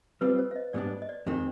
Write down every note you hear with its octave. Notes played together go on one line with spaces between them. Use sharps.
G3 C4 F4 B4
C5
F5
D#5
G#2 G3 B3 D4 D5
D5
D#5
D5
F2 D#3 G#3 C4